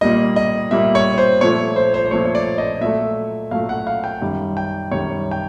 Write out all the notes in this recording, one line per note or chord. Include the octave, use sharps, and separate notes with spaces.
A#2 G3 A#3 D#5
D#5
A#2 G3 A#3 E5
C#5
C5
A#2 F3 A3 C#5
C5
C5
C5
A#2 F3 A3 C#5
C#5
D5
D#5
A#2 F#3 A3 E5
A#2 F#3 A3 F5
F#5
F5
G5
F#2 D#3 G3
G5
F#2 D#3 G3 C#5
G5